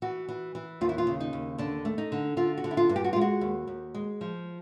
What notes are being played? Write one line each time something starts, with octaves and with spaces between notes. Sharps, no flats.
E3 F#4
E3
E3
D#2 F4
E4
F4
C#3
D#4
D#2
D3 D4
A3
D#4
D3
D3 F4
F#4
D3
E4
F4
G2
G4
F#4
F4
G#3
F#4
D#2
D#2
G#3
F3